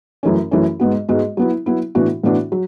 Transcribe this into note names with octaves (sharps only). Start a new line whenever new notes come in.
F#2 E3 A3 C#4
F#2 E3 A3 C#4
G#2 G#3 B3 F#4
G#2 G#3 B3 F#4
F#3 B3 E4
F#3 B3 E4
A2 E3 B3 D4 F#4
A2 E3 B3 D4 F#4
F#3